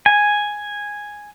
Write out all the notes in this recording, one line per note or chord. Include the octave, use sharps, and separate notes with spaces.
G#5